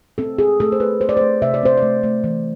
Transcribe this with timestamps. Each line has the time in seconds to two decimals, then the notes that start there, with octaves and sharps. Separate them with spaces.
0.18 C4 A4
0.39 C4 G#4
0.60 A3 A4
0.72 C5
0.80 A3 B4
1.01 A3 C5
1.09 D5
1.17 A3 C5
1.42 C3 E5
1.54 D5
1.63 C4 C5
1.77 A3 D5
2.03 A3
2.24 E3